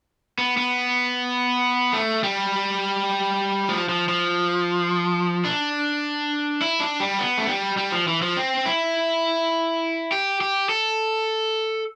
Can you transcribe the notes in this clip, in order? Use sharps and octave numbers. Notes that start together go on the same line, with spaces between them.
B3
B3
A3
G3
F3
F3
F3
D4
E4
D4
G3
B3
A3
G3
G3
F3
E3
F3
C4
E4
G4
G4
A4